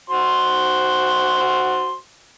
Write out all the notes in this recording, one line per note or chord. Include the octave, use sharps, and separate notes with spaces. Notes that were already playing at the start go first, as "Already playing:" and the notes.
F#4 C5 C6